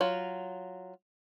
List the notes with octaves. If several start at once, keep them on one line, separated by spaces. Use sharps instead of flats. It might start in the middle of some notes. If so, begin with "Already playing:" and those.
F#3 F4